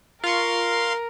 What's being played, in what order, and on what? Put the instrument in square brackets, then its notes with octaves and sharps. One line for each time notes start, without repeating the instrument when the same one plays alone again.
[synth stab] F4 C#6 [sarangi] A#4 [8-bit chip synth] F5 C6